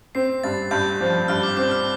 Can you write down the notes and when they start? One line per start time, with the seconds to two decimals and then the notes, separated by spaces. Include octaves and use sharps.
0.15 C4 C7
0.44 G2 A6
0.71 G2 G6
1.01 F3
1.28 G2 F6
1.43 D6
1.57 C4 D6
1.72 F6